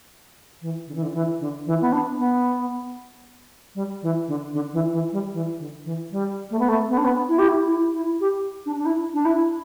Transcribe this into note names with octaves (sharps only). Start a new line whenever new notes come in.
E3
D3
E3
D3
E3
D3
E3
B3
D4
B3
G3
E3
D3
D3
E3
E3
G3
E3
D3
E3
G3
A3
B3
A3
B3
D4
B3
E4
G4
E4
E4
E4
G4
D4
D4
E4
D4
E4